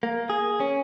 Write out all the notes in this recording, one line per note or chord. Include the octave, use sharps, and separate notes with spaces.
A#3
G#4
C#4